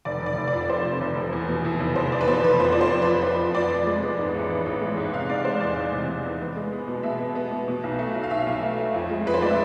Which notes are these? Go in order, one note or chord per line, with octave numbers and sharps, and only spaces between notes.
F1 D5
F1 D5
F1
D5
F2
F2 C5
C3
F1
F1
E2
B2
E2
F1
F1 C5
F1 D5
B4
B2 C5
F1 B4
F2 C5
D5
F3
C5
F2
B4
F2
F2 C5
F3
F2 D5
F2
G#3
B3
G#2
A1
B3
A1
G#3
G#2
C3 F5
C3 D5
G#3 C5
E2 D5
E2
C3
C3
E2
B3
G#3
B3
B2
B2 E5
B3
B3
B2
B2
B1
A3
B1
F5
B1 E5
B1
A3
A3
F2
G#3
F2 B4
C5
G#3 D5
E5